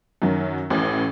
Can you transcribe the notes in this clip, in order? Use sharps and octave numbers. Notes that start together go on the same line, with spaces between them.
F#2 D#3 F#3
A1 A2